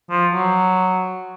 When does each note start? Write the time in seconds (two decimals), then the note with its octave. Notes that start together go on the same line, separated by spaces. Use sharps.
0.10 F3
0.33 F#3